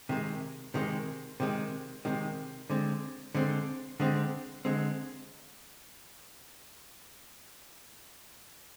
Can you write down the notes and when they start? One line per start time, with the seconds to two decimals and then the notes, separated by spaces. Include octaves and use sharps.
0.09 C3 D#3 G#3
0.74 C3 D#3 G#3
1.40 C3 D#3 G#3
2.05 C3 D#3 G#3
2.70 D3 G#3 C4
3.35 D3 G#3 C4
4.00 D3 G#3 C4
4.65 D3 G#3 C4